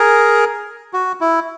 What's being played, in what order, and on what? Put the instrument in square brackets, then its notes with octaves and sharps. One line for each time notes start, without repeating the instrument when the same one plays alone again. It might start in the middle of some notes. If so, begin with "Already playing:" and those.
Already playing: [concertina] G#4 A#4
F#4
E4